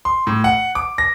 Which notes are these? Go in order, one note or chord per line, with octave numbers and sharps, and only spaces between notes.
C6
A2
F#5
D6
A#6